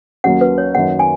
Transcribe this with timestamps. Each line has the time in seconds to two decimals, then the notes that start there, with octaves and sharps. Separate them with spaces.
0.24 D#2 D#3 F#3 C#4 F#5
0.41 B4
0.58 C#5
0.75 F#2 D#3 A#3 F#5
0.99 G#5